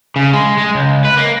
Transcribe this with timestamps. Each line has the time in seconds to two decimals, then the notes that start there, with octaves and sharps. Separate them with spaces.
0.16 C#3
0.33 G#3
0.58 G#3
0.75 C#2
1.04 B4
1.17 A#3